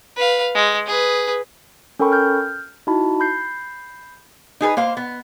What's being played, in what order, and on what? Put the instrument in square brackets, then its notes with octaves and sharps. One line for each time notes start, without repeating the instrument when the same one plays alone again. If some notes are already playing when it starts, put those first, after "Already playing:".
[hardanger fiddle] B4 F5
G#3
G#4 B4
[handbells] C#4 A4 A#4 G5 B5 C#6
F6 G6
D#4 E4 F#4 A5 B5
B5 G6 C7
[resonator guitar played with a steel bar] D#4 G#4 A4 B4
A#3 C5 F5
B3